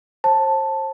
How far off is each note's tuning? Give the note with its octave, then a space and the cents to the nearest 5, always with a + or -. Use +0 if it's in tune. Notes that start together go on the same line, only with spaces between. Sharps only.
C5 +40 A5 +0